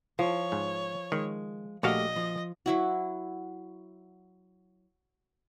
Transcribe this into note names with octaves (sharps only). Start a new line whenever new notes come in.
F3 C#5
G#2
D#3 G#3
A#1 A3 F#4 G4 D5 D#5 F5
F3
F#3 E4 F#4